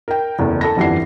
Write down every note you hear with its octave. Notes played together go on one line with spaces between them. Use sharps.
A#4 G5
F#1 E2 A3
A4 A5 B5 A#6
G1 F2 E3 G3 F#5 C7